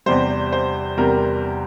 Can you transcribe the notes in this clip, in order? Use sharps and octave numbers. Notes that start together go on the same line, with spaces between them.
E2 C3 G3 C5
C5
E2 C3 G3 A#4